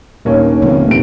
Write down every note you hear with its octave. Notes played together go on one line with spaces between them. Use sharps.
D#1 G2 A#3 C#4 D#4 C#5
F1 D3 B3 C4
D#1 D7